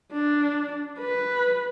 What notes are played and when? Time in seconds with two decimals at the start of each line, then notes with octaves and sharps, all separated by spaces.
0.12 D4
0.99 B4